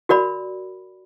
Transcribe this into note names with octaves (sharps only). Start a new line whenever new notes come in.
F#4 A#4 D5 B5